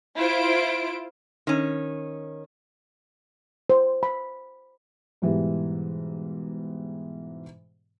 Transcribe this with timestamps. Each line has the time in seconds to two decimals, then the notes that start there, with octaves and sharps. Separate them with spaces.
0.16 E4 F4 C5 D7
1.47 D#3 C#4
3.70 C5
4.03 B5
5.22 G#2 B2 E3 G3